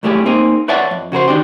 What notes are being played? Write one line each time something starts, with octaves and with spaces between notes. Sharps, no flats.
B1 A2 G3 A3 G4 G#4
A#3 C4 D#4 G#4
B4 C#5 D5 E5 F#5 A5
F2
C#3 F#4 A#4 C5
D#3 D4 D#4 G4